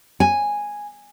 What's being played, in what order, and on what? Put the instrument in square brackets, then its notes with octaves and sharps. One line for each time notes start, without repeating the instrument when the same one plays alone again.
[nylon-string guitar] G#5